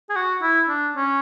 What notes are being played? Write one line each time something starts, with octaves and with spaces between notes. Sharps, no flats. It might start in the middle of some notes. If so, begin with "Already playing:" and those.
G#4
F#4
E4
D4
C#4